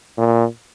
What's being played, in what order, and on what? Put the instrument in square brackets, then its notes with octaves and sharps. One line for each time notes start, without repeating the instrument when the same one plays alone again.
[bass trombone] A#2